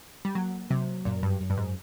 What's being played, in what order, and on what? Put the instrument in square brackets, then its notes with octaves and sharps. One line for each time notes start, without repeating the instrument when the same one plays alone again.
[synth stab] G3
[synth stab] F#3 [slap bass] A#3
[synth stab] C3 [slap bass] F#3
[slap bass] F#2 [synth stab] A#2
[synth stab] G2
[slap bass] F#2
[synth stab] G2
G#2